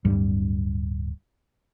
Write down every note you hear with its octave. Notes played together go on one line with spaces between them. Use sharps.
D1 G2 G3